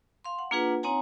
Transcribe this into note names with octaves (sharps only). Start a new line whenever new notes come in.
F5 C6
F#5
A#3 D4 F4 G#4 B4 F#5
C4 D#4 C#5 F#5 G#5 A#5